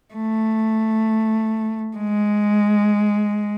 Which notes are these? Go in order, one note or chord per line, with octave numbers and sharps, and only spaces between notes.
A3
G#3